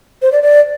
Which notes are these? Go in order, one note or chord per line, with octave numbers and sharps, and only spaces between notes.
C5
D5
D5